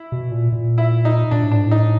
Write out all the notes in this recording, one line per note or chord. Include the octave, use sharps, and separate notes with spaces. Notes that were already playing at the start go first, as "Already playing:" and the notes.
Already playing: E4
B2
A#2
A#2
E4
D#4
A#2 D4
A2
G#2 D4
A2
D#4